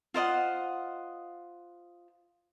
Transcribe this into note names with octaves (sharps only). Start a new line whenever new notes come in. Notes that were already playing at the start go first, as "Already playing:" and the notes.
F4 C5 D#5 F#5